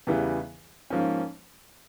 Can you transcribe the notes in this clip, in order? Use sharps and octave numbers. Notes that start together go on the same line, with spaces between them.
E2 C#3 E3 G3 B3
G#2 F3 A#3 C#4